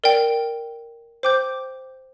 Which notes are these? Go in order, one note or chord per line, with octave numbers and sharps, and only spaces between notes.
A#4 D5 G5
C5 G5 D6 G6